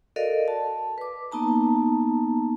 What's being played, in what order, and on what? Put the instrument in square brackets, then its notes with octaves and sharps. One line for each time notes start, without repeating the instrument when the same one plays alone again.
[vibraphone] F#4 A4 A#4 D5 D#5 F5
A5
B4 D6
A#3 B3 D#4 A5 A#5